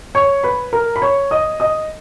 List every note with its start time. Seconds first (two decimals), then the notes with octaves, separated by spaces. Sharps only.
0.15 C#5 C#6
0.43 B4 B5
0.73 A#4 A#5
0.96 B5
1.02 C#5 C#6
1.31 D#5 D#6
1.60 D#5 D#6